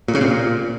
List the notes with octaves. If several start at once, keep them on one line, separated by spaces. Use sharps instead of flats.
A#2
C#3
C3
A#2